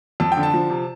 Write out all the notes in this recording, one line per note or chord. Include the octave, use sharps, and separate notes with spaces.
F2 A5
G5
D3
A5
F3
C3